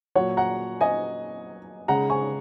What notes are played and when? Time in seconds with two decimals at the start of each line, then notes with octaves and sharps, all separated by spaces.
0.15 A#2 F#3 C#5 F#5
0.37 F#5 A#5
0.81 D#5 G#5
1.88 C#3 G#3 F#5 A#5
2.10 G#5 C#6